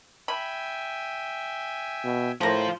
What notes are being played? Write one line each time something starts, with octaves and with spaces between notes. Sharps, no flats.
E5 G5 G#5 B5
B2
A2 F3 A#3 F4 C5